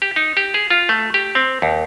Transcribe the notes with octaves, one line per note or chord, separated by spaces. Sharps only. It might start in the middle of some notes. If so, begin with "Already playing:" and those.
G4
D#4
G4
G#4
F4
A3
G4
C4
D#2